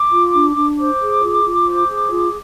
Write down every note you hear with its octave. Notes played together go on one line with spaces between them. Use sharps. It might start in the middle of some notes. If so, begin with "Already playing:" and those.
Already playing: D6
F4
D4
D4
C5 D6
G#4
F4
F4
C5
G#4
F4